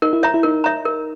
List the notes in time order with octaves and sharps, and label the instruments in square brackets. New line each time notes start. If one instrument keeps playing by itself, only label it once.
[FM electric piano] D#4 [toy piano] A#4
[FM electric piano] E4
[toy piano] C#5 E5 A#5
[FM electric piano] E4
[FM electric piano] D#4 [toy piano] A#4
[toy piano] C#5 E5 A#5
A#4